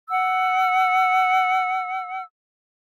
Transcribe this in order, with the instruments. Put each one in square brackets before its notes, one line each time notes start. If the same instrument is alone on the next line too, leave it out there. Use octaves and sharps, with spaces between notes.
[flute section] F#5 E6